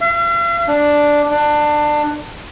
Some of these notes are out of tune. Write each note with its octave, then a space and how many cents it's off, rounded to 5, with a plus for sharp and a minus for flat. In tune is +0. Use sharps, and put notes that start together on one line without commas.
F5 -45
D4 +0
D4 +20